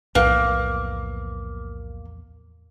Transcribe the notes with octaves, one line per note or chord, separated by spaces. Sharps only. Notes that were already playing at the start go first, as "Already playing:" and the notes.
B1 E2 A2 F3 A#3 B4 F5